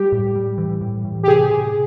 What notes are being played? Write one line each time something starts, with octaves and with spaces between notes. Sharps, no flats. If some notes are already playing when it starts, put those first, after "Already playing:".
Already playing: G3 G4
A2
G3
E3
A2
A2
G4
C3 G#4
C3